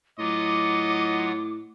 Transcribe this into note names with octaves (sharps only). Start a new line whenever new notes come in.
A2 F#3 F4 D#5 F#5 D6